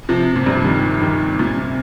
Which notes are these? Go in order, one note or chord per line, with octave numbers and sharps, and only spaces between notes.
C3 F3
A#2
G2 C3
D#3 G3
D#3 G3
A#2
C3